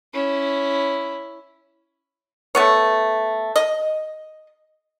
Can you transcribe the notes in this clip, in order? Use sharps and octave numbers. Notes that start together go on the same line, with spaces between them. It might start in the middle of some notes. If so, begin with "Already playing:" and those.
C#4 E4
A3 B3 C#5
D#5